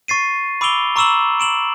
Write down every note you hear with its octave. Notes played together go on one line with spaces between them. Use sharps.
C#6 A6 C7 D#7
B5 D6 E6 D7 F7 G7
A#5 C#6 D6 E6 E7 F#7
D7 E7 F#7